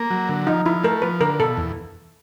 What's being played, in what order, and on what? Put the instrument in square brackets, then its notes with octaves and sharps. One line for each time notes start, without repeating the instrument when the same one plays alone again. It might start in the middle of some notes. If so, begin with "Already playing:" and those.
Already playing: [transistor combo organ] A#3
F#3
D3
[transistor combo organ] F3 [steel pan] D#4
[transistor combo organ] F3 [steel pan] E4
[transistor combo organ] A3 [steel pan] A#4
[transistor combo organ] F3 [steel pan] B4
[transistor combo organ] D3 [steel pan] A#4
[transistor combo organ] B2 [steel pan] A4
[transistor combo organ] E2